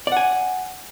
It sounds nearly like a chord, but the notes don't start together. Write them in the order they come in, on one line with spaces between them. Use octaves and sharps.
D5 F#5 G#5